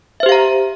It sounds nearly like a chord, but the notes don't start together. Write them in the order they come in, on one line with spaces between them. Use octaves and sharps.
E5 C5 G4 F5 A#5